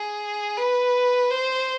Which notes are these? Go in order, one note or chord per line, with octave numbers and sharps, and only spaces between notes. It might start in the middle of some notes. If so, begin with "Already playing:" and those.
Already playing: G#4
B4
C5